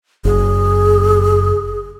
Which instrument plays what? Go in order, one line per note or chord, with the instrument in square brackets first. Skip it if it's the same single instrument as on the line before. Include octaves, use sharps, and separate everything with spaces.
[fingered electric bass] F#1 [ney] G#4